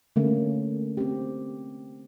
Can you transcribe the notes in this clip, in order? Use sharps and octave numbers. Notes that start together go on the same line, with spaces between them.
D3 A3 A#3 C#4
C4 G4